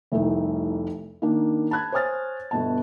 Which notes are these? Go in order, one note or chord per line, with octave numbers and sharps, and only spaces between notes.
F1 C2 A3 D#4 E4
D#3 A#3 D4
A5 B5 F#6 G#6
C5 C#5 G#5 D#6 F6 A6
G1 B2 A5